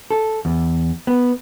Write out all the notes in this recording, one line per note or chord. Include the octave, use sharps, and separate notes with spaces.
A4
E2
B3